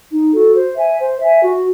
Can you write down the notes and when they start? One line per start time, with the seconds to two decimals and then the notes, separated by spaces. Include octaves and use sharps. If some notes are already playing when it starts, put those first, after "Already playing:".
0.11 D#4
0.33 F#4 A4
0.55 C5
0.76 E5 G#5
0.99 C5
1.20 E5 G#5
1.43 F#4